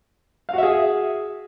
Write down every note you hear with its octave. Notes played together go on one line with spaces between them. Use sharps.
F#4 G#4 E5 F5